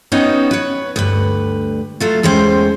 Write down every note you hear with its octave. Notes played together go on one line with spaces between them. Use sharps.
B3 C#4 D#4 F#4 C#5 G5
B4 C#5
D2 G2 B4
F#3 A3 F4
E2 G#3 C#4 C5 G5